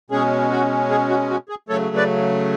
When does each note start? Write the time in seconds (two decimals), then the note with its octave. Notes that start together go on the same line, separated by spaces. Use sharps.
0.10 B2 G#3 C#4 G#4
0.51 F#4
0.90 G#4
1.09 F#4
1.30 F#4
1.49 G#4
1.69 C#3 F#3 A3 A4 C#5
1.96 B4 D5